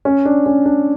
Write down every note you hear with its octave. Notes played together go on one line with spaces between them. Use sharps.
C#4
D4
C#4
D4